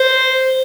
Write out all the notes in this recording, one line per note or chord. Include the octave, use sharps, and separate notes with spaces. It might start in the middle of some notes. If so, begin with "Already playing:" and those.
Already playing: C5